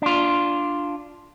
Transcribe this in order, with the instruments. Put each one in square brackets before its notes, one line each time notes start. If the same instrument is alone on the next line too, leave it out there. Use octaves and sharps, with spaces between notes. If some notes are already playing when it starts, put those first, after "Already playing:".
[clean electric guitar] D4 F4